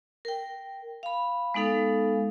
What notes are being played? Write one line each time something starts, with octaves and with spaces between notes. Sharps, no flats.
A#4 G5
F5 B5
G#3 B3 D#4 A4 F5